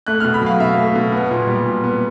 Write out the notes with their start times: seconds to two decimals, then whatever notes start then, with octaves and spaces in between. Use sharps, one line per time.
0.07 A3 F#6
0.20 F6
0.25 B2
0.34 B5
0.42 F#3 F5
0.60 B2 E5
0.77 A3
0.96 B2
1.12 B3
1.31 A#2
1.47 G3
1.66 A#2
1.84 B3